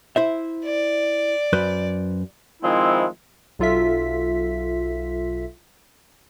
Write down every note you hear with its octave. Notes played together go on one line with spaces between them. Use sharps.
E4 C5 E5
D5
F#2 B4 C5
D#3 F3 G#3 C4 E4
B1 F#3 F4 A4 E5 B6